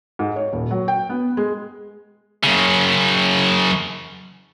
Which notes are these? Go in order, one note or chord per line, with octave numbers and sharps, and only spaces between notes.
G#2
C#5
D#1
F#3
G5
B3
G#3
F#2 C#3